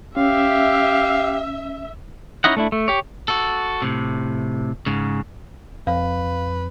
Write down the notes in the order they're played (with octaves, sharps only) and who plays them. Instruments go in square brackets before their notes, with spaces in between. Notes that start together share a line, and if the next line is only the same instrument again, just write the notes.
[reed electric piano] C#4 [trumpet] G4 [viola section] E5 [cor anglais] F5
[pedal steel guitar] C#4 D#4 E4 D#5 F#5
A3 D4 E4
A3
G4 C#5
[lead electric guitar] F#4 A4
A2 C3
G#2 C#3
[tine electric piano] F2 [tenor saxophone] B4 [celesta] F5